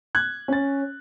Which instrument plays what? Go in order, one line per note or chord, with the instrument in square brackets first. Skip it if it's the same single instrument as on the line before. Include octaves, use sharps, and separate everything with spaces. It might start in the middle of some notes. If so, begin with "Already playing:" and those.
[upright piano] F#6 G#6
C#4 A6